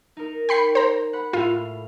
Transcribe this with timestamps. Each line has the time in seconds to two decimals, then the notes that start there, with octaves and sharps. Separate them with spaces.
0.17 D#4 A#4
0.49 G5 B5 C7
0.75 C5 A#5
1.13 F#5 B5
1.33 A2 F4 F5